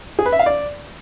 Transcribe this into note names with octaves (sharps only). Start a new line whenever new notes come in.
G#4
B4
E5
F5
D5